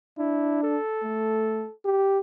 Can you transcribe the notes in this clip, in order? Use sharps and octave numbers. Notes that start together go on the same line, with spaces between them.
D4 E4
A4
A3
G4